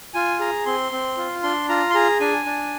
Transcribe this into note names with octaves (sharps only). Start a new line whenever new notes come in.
F4 G#5
G#4 A#5
C4 C6
C4
F4
D4 C6
F4 A#5
C6
G#4 A#5
D4 G#5
D4